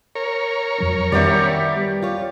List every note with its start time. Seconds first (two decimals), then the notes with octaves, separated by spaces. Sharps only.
0.15 A#4 C#5
0.78 F2 F#3 D4
1.12 D#3 G3 B3 C#4 G4 D5 E5
2.02 F4 C#5